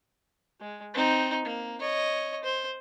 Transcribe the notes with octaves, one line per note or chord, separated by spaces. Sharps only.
G#3
C4 D#4
A#3
C#5 D#5
C5